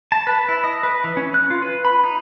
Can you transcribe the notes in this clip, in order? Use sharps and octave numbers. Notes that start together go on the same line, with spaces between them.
A5
B4
E4
D#5
B4
E3
C#4
F#6
F4
B4
B5
D#4